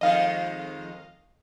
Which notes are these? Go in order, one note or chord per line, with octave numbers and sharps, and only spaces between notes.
F2 D#3 G#3 D#5 F5